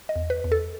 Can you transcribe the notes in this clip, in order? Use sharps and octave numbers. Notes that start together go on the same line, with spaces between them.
D#5
E2
B4
E2
A4